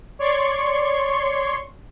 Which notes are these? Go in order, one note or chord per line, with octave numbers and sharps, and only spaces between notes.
C#5 D5 C6 C#6